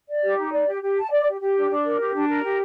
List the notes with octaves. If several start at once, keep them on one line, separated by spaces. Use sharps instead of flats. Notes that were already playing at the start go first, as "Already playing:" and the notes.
D5
G4
D#4
D5
G4
G4
A5
D5
G4
G4
D4
D4
A#4
G4
D4
A#4
G4